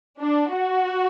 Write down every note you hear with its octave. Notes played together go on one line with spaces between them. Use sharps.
D4
F#4